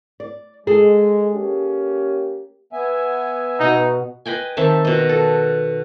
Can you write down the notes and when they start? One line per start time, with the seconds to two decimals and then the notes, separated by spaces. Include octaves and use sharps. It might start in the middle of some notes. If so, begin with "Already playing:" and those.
0.20 D5
0.67 G#3 G#4 A4
1.34 A#3 C#4 G4
2.73 B3 E5 G#5
3.60 B2 D#4
4.26 B4 D#5 G5 G#5
4.57 D#3 C4 E5 A5
4.85 B2 D#5
5.09 A4